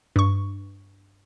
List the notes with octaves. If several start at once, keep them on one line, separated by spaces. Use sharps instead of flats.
G2 C#6